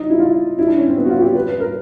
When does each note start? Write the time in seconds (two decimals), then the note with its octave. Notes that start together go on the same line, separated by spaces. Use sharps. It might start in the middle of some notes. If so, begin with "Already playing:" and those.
Already playing: D#4
0.10 E4
0.19 F4
0.59 E4
0.68 D4
0.77 C#4
0.87 C4
0.97 B3
1.05 F#4
1.09 F4
1.18 F#4
1.22 G4
1.35 B4
1.48 B4
1.60 A#4